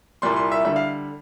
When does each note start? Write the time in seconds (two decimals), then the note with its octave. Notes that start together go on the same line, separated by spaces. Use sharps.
0.22 C2 A#2 G3 C6
0.36 C6
0.52 E5
0.65 D3 G3 E5
0.76 F5